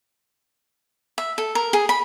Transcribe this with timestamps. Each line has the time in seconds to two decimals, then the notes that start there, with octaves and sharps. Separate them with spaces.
1.18 E5
1.38 A4
1.55 A#4
1.73 G#4
1.89 B5